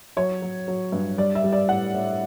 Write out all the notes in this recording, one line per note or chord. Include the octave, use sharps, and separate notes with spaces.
F#3 C#5
F#3
F#3
G2
G3 D5
E5
G3
D5
A2 F#5
A2